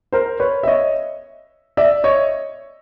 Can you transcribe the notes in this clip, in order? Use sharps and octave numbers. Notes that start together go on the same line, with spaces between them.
A#4 C5
B4 C#5
E5
C#5 D#5
D5 E5
C#5 D#5